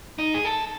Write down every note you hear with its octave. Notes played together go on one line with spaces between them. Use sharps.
D#4
G#4
A4